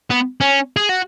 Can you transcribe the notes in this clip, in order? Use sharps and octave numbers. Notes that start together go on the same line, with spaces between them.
B3
C#4
G#4
F#4